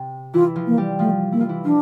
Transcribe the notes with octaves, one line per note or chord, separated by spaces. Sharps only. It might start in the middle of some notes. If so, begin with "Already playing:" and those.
Already playing: C3 C4
E3 E4 F4
F3 F4
A#3
G3 G4
F3 A3 F4
A#3 E4
F4
E3 E4
F3 D4 F4